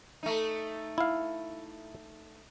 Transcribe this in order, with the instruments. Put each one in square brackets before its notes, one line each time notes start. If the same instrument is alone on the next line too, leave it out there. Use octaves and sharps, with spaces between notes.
[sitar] A3 D#4
[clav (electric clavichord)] E4 F5